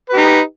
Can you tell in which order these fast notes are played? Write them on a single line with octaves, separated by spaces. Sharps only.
B4 G4 D#4